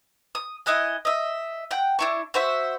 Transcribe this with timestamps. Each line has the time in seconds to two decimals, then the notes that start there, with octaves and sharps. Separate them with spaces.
0.35 D#6
0.66 E4 D#5 F#5 G#5
1.05 D#5 E5
1.71 F#5 G5
1.99 D4 E4 C#6
2.34 F#4 C5 E5